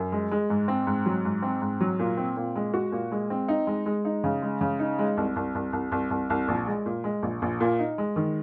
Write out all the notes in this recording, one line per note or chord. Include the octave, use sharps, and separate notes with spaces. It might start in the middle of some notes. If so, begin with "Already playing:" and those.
Already playing: F#2
G#3
G#3
G#2
C4
G#2
F#3
G#2
C4
G#2
F#3
A#2
C4
A#2
G#3
F#4
A#2
G#3
C4
D#4
G#3
G#3
D#4
C#3
G#3
C#3
D#4
G#3
C2
C2
C2
C2
C2
C2
C2
A#1
G#3
A#2
G#3
A#1
A#1
A#2
D#4
G#3
D#3